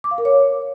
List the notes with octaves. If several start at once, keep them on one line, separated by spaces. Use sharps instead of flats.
D6
F5
A#4
C#5